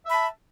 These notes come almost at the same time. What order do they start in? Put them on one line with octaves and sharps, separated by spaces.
E5 B5 A5